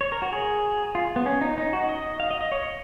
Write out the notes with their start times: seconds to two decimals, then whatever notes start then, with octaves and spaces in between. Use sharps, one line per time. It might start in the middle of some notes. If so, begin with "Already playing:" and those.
0.01 C#5
0.12 A#4
0.22 F#4
0.33 G#4
0.95 F4
1.16 B3
1.26 C#4
1.41 D#4
1.58 D#4
1.73 F#4
1.89 D#5
2.20 F5
2.31 D#5
2.41 D#5
2.52 C#5